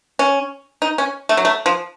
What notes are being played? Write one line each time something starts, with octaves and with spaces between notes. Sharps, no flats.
C#4
D#4
C#4
A3
F#3
A3
F3